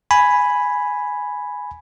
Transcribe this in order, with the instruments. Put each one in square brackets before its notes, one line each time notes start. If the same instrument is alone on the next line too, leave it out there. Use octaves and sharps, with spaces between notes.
[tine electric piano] G#5 B5